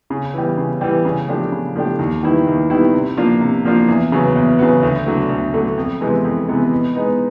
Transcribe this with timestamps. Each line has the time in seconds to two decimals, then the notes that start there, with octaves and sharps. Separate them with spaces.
0.10 C#3
0.34 E3 G3
0.57 C#3
0.81 E3 G3
1.05 C#3
1.28 F3 A3 D4 G4
1.52 C#3
1.75 F3 A3 D4 G4
1.99 D#2
2.23 D#3 G3 B3 E4
2.47 D#2
2.70 D#3 G3 B3 E4
2.94 C3
3.17 F3 A#3 D4 F4
3.40 C3
3.65 F3 A#3 D4 F4
3.88 E2
4.12 C#3 F#3 B3
4.36 E2
4.59 C#3 F#3 B3
4.83 D2
5.06 D3 F#3 A3
5.29 D2
5.54 D3 F#3 A3
5.77 F2
6.01 C3 E3 G#3 B3
6.24 F2
6.48 C3 E3 G#3 B3
6.72 B2
6.95 G#3 B3 D#4